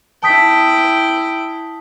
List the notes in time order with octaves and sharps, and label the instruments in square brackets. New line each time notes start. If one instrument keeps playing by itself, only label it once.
[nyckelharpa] E4 G5 [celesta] A5 D#6 B6